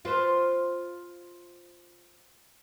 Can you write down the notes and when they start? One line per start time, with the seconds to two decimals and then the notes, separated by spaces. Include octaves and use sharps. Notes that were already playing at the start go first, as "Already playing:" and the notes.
0.05 F4 B4 C5